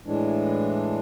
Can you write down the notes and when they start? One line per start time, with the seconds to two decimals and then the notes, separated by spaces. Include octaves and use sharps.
0.04 A2 E3 G#3 D4